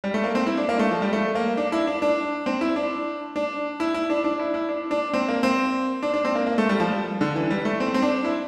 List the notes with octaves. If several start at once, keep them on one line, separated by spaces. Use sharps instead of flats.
G3
A3
A#3
C4
E4
D4
A#3
A3
F3
G3
A3
A#3
D4
E4
D4
D4
C4
E4
D4
D4
E4
E4
D4
D4
E4
E4
D4
D4
C4
A#3
C4
D4
D4
C4
A#3
A#3
A3
G3
F3
G3
D3
E3
G3
A3
C4
C4
D4
E4